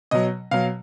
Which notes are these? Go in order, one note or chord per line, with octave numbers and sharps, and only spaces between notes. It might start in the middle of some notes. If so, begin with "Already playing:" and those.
B2 F#3 D#5
B2 F#3 F5